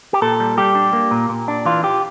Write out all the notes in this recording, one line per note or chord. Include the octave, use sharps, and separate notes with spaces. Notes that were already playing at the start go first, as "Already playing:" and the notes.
G4
A#2 A4
G3
G3 G4
D4
A#3
A#2
A#2
D4
E3 F4
F4 G4